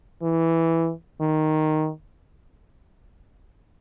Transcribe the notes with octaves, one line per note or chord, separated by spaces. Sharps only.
E3
D#3